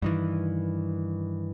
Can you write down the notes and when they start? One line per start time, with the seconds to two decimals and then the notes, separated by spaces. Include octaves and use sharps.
0.02 G2 D#3 E3